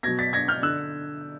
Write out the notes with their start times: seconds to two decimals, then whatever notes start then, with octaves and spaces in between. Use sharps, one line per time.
0.03 B2 F#3 G#6 A#6
0.19 A6 B6
0.33 G#6 A#6
0.48 F6 G6
0.63 D3 E6 F#6